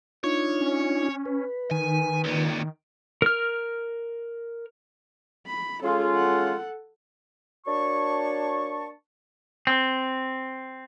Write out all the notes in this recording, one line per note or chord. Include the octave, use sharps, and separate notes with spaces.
D4 D#4 F4 C#5
C#4
B4
D#3 G#5
C#2 A#2
A#4 F6
B5
G#3 C#4 F4 G#4 A4
A4 F#5
A#3 D4 F#4 C#5 A5 C#6
C4